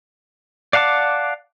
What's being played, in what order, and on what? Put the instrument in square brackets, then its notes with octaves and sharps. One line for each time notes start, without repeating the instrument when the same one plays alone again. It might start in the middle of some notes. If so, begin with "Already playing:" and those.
[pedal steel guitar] D5 F5 F#5 A5 D6